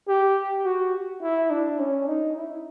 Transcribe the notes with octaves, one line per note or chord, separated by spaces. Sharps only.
G4
F#4
E4
D4
C#4
D#4
E4